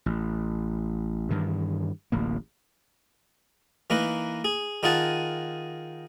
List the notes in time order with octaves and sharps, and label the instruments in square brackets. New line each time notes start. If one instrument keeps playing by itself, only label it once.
[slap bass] A1
G2 D#3 E3
D1 A1 A#3
[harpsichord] E3 A#3 D#4 A#4 B4
G#4
D#3 D#4 F4 G#4 F#5 A5